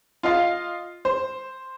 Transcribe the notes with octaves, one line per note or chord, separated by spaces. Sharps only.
F4 D#5 F5
C5